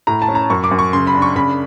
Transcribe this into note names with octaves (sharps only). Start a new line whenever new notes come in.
A2 A#5
A5
C#4
A#5
F#2 C#6
D6
F#2
C#6
C#3 C6
B5
D4
C#6
C#3 B5